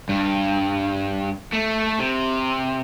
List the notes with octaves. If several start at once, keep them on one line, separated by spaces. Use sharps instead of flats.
G2
A3
C3